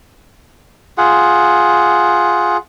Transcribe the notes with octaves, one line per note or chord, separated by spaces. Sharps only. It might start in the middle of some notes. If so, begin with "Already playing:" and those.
F4 G#4 F#5